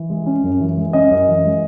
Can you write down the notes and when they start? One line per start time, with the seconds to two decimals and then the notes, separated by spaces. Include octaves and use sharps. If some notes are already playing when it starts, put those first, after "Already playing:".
Already playing: E3
0.10 G#3
0.26 C#4
0.44 F#2
0.60 E3
0.77 G#3
0.93 C#4 D#5
1.11 F#2
1.28 E3
1.45 G#3